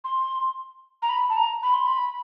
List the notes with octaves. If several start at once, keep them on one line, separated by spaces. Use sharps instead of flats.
C6
A#5
B5
A5
A#5
B5
C6
B5